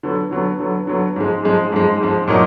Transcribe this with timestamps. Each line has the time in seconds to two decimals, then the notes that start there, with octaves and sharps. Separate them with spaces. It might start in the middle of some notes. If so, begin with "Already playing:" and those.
0.03 D3 F#3 B3
0.31 D3 F#3 B3
0.59 D3 F#3 B3
0.87 D3 F#3 B3
1.16 G#2 F3 G#3
1.43 G#2 F3 G#3
1.72 G#2 F3 G#3
2.00 G#2 F3 G#3
2.27 A#2 F#3 A#3 D#4